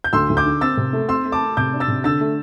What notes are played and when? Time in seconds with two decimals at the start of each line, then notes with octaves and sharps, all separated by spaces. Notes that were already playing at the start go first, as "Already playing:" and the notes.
0.04 G6
0.13 D2 C6 E6
0.30 D2
0.37 D6 G6
0.45 D3
0.61 C4 E6 A6
0.77 C3
0.93 A3
1.09 C4 C6 E6
1.25 A3
1.32 A5 D6
1.41 A3
1.57 C3 D6 G6
1.73 D4
1.80 E6 A6
1.88 C3
2.04 D3 E6 A6
2.21 A3